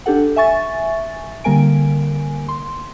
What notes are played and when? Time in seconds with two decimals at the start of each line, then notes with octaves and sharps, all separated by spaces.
0.06 D4 G4 A4 F#5
0.36 E5 G#5 C#6 A6
1.44 D3 G3 A#3 A#4 G#5 D7
2.48 C6